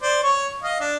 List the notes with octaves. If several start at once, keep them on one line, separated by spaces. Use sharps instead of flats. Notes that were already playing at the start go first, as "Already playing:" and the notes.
C5 D5
C#5 C#6
D#5 F5
D4